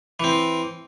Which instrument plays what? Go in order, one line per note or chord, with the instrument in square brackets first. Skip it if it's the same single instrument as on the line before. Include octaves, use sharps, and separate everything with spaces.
[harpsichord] E3 C4